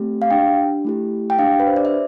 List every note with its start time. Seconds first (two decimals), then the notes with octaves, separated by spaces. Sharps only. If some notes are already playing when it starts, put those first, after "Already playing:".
Already playing: A3 C4 G4
0.22 F5
0.30 D4 G4 G5
0.85 A3 E4 G4
1.30 G5
1.39 D4 G4 F5
1.60 B4
1.67 C5
1.76 D5
1.85 E5